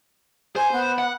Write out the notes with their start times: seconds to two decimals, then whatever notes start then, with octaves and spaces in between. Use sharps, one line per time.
0.56 C5 G#5
0.72 B3
0.98 F#5